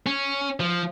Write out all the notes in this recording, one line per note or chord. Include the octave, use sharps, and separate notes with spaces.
C#4
F3